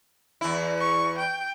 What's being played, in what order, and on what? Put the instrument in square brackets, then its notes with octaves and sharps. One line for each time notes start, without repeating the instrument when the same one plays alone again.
[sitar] E2 E4
[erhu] C#6
G5